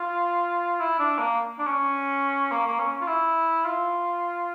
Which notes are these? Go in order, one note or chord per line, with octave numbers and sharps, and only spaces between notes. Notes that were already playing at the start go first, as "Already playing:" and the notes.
Already playing: F4
E4
D4
A#3
D4
C#4
A#3
A#3
C#4
F4
E4
F4